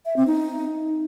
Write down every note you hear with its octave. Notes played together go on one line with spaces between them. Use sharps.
E5
C4
D#4